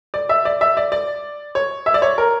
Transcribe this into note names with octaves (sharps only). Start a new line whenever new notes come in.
D5
E5
D5
E5
D5
D5
C#5
E5
D5
C#5
A#4